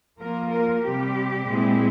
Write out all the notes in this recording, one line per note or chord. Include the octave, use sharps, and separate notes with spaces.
F3 A#3 F4 A#4
A#4
C3 G3 C4 G4
A#2 G#3 C4 E4